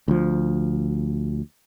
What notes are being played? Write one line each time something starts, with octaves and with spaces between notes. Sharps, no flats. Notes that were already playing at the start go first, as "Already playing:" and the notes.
D2 F3